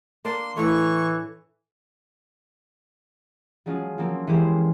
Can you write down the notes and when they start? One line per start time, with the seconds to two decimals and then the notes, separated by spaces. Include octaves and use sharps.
0.25 A#3 D4 D5 C6
0.56 A2 E3 A3 C#6
3.66 F3 F#3 G#3 C#4 F4
3.98 F3 F#3 A#3 C4
4.27 E3 G#3 A#3 C#4 G4 C5